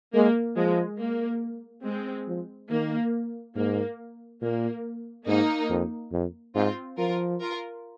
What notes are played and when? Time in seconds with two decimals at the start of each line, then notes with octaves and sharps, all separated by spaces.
0.14 G#3 A#3
0.56 F3 G#3
0.99 A#3
1.85 G#3 C4
2.28 F3
2.70 D#3 A#3
3.56 G#2 A#3
4.42 A#2 A#3
5.27 G#2 A#3 D#4
5.70 F2
6.12 F2
6.55 G#2 C4 F4
6.98 F3 F4 A#4
7.41 F4 A#4